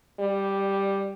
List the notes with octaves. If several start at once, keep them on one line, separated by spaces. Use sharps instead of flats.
G3